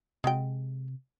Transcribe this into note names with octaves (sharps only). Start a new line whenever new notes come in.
C3 G#3 F#4 G5